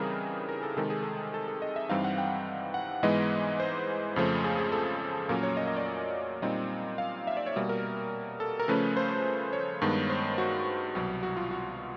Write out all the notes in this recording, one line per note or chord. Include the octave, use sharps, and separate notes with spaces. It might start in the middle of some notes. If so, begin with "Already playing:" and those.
Already playing: C#3 E3 G3 C4 D#4 G#4 A#4
A#4
A4
C3 D#3 G#3 A4
G#4
A4
A4
A4
D#5
E5
G2 E3 G3 C4 D#4 F5
F#5
G5
F#5
G#2 E3 G#3 B3 D#5
C5
F2 C#3 F3 A3
G#4
G#4
A4
A#2 F#3 A#3 C#4 A#4
C#5
D#5
D#5
D5
A#2 G3 C4 D#4 D#5
F5
E5
D5
C#5
B2 G3 A#3
A#4
A4
A#4
C#3 F3 A3 C#4 B4
C5
C#5
G2 D#3 G#3 B3
C5
F#4
C2 B2 F#3
F#4
F4
F#4